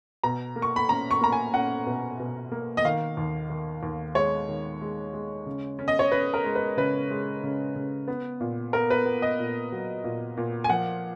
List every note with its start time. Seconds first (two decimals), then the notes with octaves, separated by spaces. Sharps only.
0.23 B2 A#5
0.56 A#3
0.62 C#6
0.76 B5
0.89 C#4 A#5
1.11 C#6
1.21 A#3 A#5
1.32 G#5
1.54 C#4 F#5
1.86 B2
2.20 B2
2.52 A#3
2.77 D#5
2.85 D#3 F5
3.17 D#2
3.50 D#3
3.83 D#2
4.15 G#3 C#5
4.49 D#3
4.81 G#3
5.13 G#3
5.46 C#3
5.79 C#4
5.88 D#5
5.99 C#5
6.12 C#4 B4
6.34 A#4
6.44 G#3
6.55 B4
6.77 C#3 B4
7.11 G#3
7.43 C#3
7.76 C#3
8.08 B3
8.41 A#2
8.73 B3 A#4
8.90 B4
9.06 B3
9.22 D#5
9.39 A#2
9.72 F#3
10.04 A#2
10.37 A#2
10.64 G#5
10.69 F3 F#5